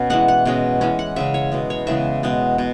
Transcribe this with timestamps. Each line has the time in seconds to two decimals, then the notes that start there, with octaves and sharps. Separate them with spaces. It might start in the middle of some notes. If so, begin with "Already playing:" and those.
Already playing: B2 C#4
0.10 E3 G#3 B3 F#5
0.28 F#5
0.45 B2 G#3 C#4
0.81 E3 G#3 C#4
0.99 F#5
1.16 C#3 G#3 C#4 E5
1.34 C#5
1.52 B2 G#3 B3
1.70 C#5
1.87 C#3 E3 G#3 B3 E5
2.23 B2 G#3 B3
2.58 B2